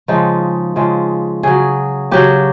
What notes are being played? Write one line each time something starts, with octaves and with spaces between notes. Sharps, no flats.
C#3 F3 G#3 D#4
C#3 F3 G#3
C#3 F#3 G#4
C#3 F#3 G4